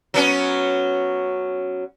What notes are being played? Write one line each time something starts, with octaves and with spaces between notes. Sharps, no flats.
F#3 B3 C#4